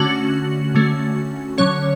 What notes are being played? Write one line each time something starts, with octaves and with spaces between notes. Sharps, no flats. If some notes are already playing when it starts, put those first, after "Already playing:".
Already playing: D3 A3 C#4 F#4
D3 A3 C#4
D3 F#3 C#4 C#5